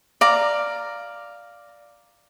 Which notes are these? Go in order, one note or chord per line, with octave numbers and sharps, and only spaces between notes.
D5 F5 A#5